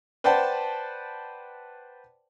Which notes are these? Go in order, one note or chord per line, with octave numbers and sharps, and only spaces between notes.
B4 C5 D5 F#5 G5 A5